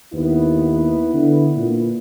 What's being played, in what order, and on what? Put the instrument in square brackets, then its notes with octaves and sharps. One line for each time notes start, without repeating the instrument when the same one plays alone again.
[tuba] D#2 [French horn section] B3 E4 B4
[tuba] D3
A#2